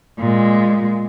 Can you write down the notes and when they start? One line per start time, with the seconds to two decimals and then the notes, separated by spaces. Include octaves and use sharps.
0.19 A#2 G#3